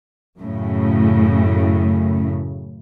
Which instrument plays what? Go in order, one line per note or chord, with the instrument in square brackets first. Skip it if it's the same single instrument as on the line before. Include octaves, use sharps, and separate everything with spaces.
[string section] F#2 A2 C#3